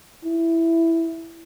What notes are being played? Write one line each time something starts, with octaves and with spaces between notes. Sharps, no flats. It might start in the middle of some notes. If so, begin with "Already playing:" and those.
E4